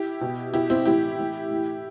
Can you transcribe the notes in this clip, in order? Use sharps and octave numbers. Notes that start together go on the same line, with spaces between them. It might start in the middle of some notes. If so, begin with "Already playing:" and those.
Already playing: E4 G4
B2
B2 E4 G4
C4 E4
A2 E3 E4 G4
A2 E3
A2 E3